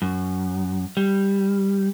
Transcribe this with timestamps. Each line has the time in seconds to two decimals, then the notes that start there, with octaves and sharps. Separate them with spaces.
0.02 F#2
0.97 G3